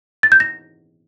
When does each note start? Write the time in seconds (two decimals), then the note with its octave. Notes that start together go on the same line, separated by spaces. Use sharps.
0.23 A6
0.32 G6
0.40 A#6